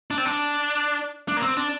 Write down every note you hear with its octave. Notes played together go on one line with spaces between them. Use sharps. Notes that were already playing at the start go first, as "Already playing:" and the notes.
D4
C4
D4
D4
A#3
C4
D4